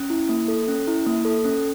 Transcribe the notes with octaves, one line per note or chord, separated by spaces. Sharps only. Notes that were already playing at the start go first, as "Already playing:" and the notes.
Already playing: C#4
E4
A#3
A4
C#4
E4
A#3
A4
C#4